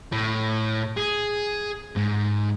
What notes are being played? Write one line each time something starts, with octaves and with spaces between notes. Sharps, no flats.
A2
G#4
G#2